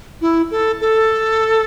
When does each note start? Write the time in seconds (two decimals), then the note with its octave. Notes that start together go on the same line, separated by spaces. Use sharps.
0.21 E4
0.51 A4
0.81 A4